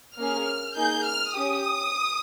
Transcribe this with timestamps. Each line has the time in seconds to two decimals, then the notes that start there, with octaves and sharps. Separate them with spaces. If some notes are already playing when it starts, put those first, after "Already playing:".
0.18 A#3 C#4 G#4 F6
0.76 A#3 D#4 G#4 G6
1.06 F6
1.35 C#4 G4 D#6